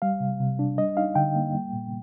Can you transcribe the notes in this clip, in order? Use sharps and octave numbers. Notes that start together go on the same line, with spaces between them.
G3 F5
C3
C3
D4
G3 D#5
D#4 F5
D3 G5
A#3
G3
A#2